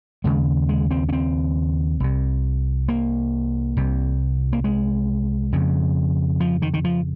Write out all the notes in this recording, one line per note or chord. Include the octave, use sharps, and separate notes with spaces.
D#2 C#3 G#3
G#3
C4
C#4
C4
C2 C3
A#3
C2 C3
A#3
G#3
F2 C#3
F3
D#3
D#3
F3